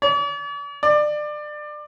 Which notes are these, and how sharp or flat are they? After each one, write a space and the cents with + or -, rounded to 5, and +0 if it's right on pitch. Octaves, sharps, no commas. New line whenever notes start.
D5 -45
D5 +25